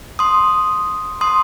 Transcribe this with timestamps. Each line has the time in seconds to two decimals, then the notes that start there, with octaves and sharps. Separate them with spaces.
0.19 C6 D#6
1.21 C6 D#6